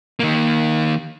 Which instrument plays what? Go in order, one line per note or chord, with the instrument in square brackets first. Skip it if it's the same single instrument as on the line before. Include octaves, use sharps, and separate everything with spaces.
[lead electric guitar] D#3 A#3